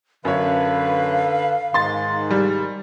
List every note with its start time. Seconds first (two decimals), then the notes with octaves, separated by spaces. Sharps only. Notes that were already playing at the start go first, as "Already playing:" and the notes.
0.25 F#2 D3 B4 C#5 F5
1.74 G#2 D#3 C6 A6
2.31 G3